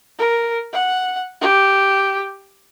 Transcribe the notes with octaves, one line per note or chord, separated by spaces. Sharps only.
A#4
F#5
G4